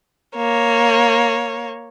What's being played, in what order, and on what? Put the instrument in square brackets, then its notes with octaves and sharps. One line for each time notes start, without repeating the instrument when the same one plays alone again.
[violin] A#3 C#5